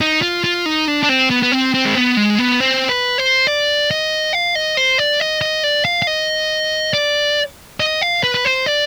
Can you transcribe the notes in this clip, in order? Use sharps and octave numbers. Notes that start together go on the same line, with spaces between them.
D#4
F4
F4
D#4
D4
D4
C4
B3
B3
C4
C4
G#3
B3
G#3
B3
C4
B4
C5
D5
D#5
F5
D#5
C5
D5
D#5
D#5
D5
F5
F5
D#5
D5
D#5
F5
B4
B4
C5
D5